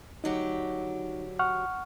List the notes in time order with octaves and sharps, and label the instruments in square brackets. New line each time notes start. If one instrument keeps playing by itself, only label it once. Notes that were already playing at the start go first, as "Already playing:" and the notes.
[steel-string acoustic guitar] D2 F#3 G4 [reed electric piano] D#4
[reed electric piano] F#5 C#6 F6